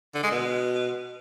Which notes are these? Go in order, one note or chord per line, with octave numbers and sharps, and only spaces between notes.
D3
G#3
B2